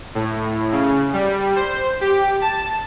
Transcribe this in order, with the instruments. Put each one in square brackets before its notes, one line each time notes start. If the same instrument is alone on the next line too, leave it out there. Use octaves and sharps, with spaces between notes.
[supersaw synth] A2
C#3
G3
C5
G4
A5